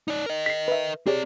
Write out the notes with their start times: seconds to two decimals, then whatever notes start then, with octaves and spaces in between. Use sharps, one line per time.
0.08 D#4 D5
0.26 A#4 D#5
0.46 B6 C7
0.68 B4 E5
1.06 C4 G4 G#4 C#5 D5